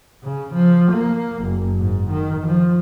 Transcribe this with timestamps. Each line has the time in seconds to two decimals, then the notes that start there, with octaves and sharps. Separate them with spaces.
0.23 C#3
0.54 F3
0.91 A#3
1.43 F#1
1.79 G#2
2.10 D#3
2.46 F3